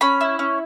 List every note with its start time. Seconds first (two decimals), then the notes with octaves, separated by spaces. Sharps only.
0.01 C#4 B5
0.21 E4
0.39 C#4